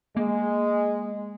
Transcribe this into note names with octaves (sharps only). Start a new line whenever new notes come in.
G#3 A#3